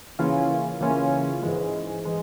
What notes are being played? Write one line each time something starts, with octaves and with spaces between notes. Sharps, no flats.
C#3 E3 A#3 C#4 F4
C#3 E3 A#3 C#4 F4
G#2 E3 G#3
E3 G#3